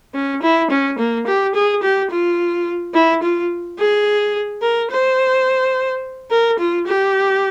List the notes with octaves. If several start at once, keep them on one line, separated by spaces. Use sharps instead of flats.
C#4
E4
C#4
A#3
G4
G#4
G4
F4
E4
F4
G#4
A#4
C5
A#4
F4
G4